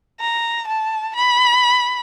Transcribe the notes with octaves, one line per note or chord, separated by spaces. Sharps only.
A#5
A5
B5